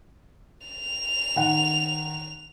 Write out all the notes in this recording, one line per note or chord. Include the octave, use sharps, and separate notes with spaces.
F7
D#3 F#5